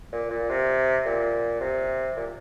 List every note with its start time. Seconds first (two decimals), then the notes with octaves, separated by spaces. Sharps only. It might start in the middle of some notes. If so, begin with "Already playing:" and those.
0.12 A#2
0.30 A#2
0.50 C3
1.05 A#2
1.60 C3
2.16 A#2